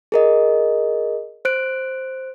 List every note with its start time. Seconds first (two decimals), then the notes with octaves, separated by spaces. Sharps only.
0.12 G#4 A#4 D#5
1.45 C5 F#6 D7